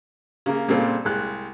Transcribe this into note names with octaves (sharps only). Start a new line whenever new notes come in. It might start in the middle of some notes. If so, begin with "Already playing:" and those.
C#3 A#3
A#2 C#3 G3 C4 F4 A4
C2 G#3 F#6